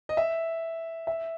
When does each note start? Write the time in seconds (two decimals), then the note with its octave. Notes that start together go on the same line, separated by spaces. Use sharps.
0.09 D#5
0.17 E5
1.07 E5